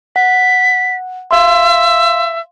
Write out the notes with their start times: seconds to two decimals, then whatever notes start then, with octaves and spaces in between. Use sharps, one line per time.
0.16 F#5 B6
1.31 E5 F5 C6